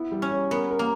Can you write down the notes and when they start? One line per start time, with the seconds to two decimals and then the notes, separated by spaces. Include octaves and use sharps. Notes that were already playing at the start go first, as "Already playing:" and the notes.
Already playing: B3 E4
0.12 G3
0.22 C#4
0.31 G3
0.51 B3 A#4
0.71 A#4
0.79 A#3